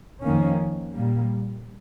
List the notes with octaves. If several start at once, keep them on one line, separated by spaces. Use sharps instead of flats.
F2 D#3 A#3 C#4
A#2 G3 A#3